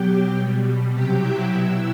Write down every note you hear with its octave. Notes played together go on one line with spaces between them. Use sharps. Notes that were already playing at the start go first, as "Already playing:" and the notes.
Already playing: B2 F#3 G4 G5
B2 G3
C3 F#3 G4 G5
E4 E5
B2 F#3 E4 E5